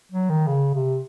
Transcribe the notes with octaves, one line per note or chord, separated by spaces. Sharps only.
F#3
D#3
C#3
C3